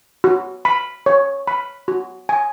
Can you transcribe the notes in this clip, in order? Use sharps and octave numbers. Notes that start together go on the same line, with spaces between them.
F#4
B5
C#5
B5
F#4
G#5